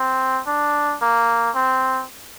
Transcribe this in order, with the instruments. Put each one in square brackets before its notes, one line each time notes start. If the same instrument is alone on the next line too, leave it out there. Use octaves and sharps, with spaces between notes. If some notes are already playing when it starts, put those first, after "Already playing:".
Already playing: [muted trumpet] C4
D4
A#3
C4